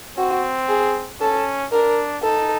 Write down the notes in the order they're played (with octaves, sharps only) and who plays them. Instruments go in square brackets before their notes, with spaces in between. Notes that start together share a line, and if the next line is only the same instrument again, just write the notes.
[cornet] C4 [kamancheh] F#4
[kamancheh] G#4
[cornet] C#4 [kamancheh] A4
[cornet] D4 [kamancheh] A#4
[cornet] D#4 [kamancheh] A4